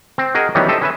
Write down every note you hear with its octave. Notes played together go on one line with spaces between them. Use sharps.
C4
F#4 G#4 A#4 D#5 G#5
D#3 E3 F#3 G3 B3 C#4
G4 A4 C5 D#5 E5
C#4 B4 E5